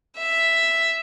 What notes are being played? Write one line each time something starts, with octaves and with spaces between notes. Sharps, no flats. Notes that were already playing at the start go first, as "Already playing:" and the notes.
E5